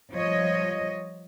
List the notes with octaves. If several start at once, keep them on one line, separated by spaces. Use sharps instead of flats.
F3 G3 C#5 D#5